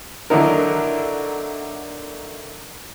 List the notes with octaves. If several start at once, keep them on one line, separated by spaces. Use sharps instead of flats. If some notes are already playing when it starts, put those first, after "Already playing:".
D3 F#3 A#3 D#4 E4 A#4